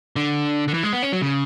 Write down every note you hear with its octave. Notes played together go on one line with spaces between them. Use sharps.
D3
D3
E3
G#3
B3
C#4
F#3
C#3